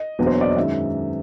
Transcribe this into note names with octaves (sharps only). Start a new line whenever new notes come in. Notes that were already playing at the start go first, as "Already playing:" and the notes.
Already playing: D#5
E2 B2 F#3 A#3 D4
C5
C#5
D5
D#5
F#2 D#3 G#3 E5